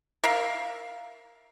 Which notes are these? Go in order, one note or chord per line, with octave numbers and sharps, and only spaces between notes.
A#4 E5 F5